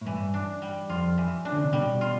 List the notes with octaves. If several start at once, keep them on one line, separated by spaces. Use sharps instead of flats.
A2
G2 E3
D4
G3
F2 F4
E3
D4
D3
C3
B2 G3
F4